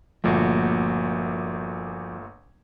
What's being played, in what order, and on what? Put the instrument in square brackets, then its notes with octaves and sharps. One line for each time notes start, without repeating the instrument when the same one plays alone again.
[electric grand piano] G1 A#2 A3 [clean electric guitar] F3 A#3 F#4